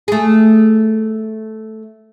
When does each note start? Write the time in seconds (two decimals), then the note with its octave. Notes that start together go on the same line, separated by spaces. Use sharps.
0.08 A3 G#4